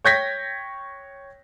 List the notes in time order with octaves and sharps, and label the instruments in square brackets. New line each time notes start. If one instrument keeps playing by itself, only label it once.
[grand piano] C#5 G5 G6 G#6 A#6 B6